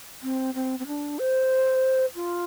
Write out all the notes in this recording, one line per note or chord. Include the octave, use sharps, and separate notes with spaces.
C4
C4
C4
D4
C5
F4